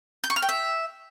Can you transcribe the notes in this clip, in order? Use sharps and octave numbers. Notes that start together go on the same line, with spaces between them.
G6
C#6
F6
G5
E5